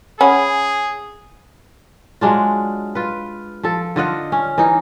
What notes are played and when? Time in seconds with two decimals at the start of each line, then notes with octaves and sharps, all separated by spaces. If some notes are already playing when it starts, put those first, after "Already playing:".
0.21 C#4 G#4 F#5 G#5 B5
2.21 F#3 G#3 D4 F4
2.95 F4 B4
3.63 F3 A4
3.96 D3 F4 D#5 F#5
4.32 C#4
4.58 E3 D#4